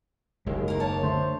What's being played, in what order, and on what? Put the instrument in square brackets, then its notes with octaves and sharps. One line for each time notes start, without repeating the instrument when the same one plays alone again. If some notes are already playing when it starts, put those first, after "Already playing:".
[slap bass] F#1 [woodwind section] D#2 [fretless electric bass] G#3
[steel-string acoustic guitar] A#3 A#4
C#5 A5
[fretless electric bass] D3 A3 [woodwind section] C5